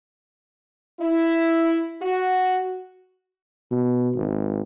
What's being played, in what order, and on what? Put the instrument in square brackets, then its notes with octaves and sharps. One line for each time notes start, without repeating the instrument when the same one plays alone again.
[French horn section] E4
F#4
[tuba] B2
G#1